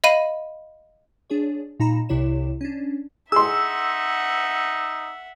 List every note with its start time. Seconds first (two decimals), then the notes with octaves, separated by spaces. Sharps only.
0.04 D#5 F5 B5 D#7
1.30 D4 G#4 C#5
1.80 A#2 D#4 A#5 B5 E7
2.09 C2 C3 E4 C#5 E7
2.61 C#4 D4
3.32 D#4 G#4 E5 F#5 C6 E6